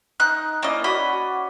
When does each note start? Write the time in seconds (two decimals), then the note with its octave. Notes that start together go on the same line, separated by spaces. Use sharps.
0.20 D#4 F#6
0.63 A#3 C#4 E4 D5 D#5
0.84 F#4 D#5 B5